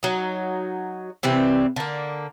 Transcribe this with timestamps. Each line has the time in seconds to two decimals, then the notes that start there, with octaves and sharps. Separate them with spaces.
0.03 F#3 D#4
1.23 C3 E3 G3 C4
1.76 D3 A#3